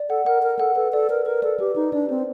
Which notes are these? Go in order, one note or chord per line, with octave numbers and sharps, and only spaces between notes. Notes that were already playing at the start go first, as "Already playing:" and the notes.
Already playing: D5
A4 F#5
A#4 F#5
A#4 F#5
A4 F#5
A4 B4
A4 D5
A#4 B4
A#4 B4
A4 D5
G4 B4
D#4 B4
D4 D5
C4 C5